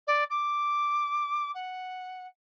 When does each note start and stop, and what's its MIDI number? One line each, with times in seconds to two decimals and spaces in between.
0.07 0.24 74
0.30 1.51 86
1.55 2.27 78